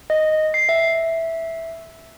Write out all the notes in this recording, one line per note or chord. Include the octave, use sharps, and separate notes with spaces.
D#5
C7
E5